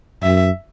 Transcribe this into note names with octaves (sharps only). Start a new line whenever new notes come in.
F#2 E5